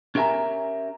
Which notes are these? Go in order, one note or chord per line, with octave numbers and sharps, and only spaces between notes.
C#4 G4 A#4 E5 G#5 A#5